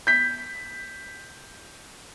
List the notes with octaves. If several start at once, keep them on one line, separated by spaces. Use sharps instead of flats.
G6 B6